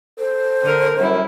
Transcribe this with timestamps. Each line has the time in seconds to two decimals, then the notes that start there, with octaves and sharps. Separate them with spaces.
0.19 A4 C5
0.63 D3 A#4
0.98 F#2 G3 E4